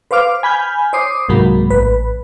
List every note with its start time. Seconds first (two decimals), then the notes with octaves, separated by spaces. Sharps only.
0.11 B4 C5 F5 D6 F6
0.43 G#5 B5 F6 G6
0.93 C5 C#5 D6 D#6 C7
1.29 C2 G#2 F#3 A#3 B5
1.70 A1 B4